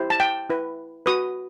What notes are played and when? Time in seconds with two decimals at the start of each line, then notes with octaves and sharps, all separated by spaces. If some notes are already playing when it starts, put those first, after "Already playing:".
Already playing: E4 G4 C5
0.10 A5
0.20 G5
0.50 E4 B4
1.06 F#4 B4 D#6